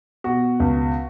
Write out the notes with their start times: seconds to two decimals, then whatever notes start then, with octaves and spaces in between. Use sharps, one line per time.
0.24 B2 F#4
0.60 C#2